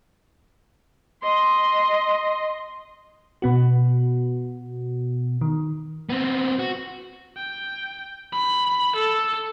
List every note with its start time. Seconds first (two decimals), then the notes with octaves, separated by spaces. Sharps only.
1.22 D#5 C6
3.42 B2 B3 F#4
5.41 D#3
6.09 B3 C4
6.59 F#4
7.36 G5
8.33 B5
8.96 A4